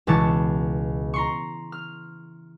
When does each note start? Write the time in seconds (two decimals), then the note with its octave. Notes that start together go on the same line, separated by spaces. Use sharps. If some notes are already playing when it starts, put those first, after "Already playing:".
0.07 C#2 B2 E3 A5 C#6
1.14 A#5 C6 C#6
1.72 F6